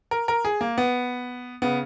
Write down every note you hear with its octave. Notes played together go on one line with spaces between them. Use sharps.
A#4
A#4
G#4
A#3
B3
C#3 B3